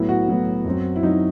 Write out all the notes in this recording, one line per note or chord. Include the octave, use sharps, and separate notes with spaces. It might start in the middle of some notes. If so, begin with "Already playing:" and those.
Already playing: A2 F#3 B3 E4
F#4
A2 F#3 B3
F#2 F#3 C4
E4
F#3 C4 D#4